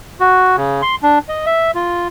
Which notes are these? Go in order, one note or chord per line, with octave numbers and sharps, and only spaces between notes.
F#4
C#3
C6
D4
D#5
E5
F4